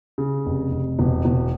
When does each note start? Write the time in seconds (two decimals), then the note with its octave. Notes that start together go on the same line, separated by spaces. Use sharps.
0.18 C#3
0.46 F1
0.71 F1
0.99 E1
1.25 E1